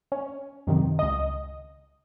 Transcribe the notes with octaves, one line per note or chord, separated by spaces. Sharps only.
C#4
F#2 C3 D#3
C#2 D#5